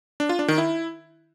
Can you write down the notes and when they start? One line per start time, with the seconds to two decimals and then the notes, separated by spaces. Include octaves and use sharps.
0.20 D4
0.29 F4
0.39 D4
0.48 D#3
0.58 E4